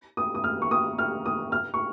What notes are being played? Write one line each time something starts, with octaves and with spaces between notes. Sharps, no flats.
D#6
D#6
F6
C#6
D#6
F6
D#6
F6
C#6